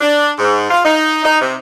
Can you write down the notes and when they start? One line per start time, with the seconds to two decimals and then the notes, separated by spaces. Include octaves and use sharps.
0.01 D4
0.38 G#2
0.70 F4
0.85 D#4
1.24 D#4
1.41 C3